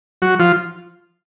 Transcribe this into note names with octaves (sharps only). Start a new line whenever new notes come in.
F#3 F#4
F3 F4